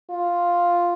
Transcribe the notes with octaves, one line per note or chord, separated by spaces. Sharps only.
F4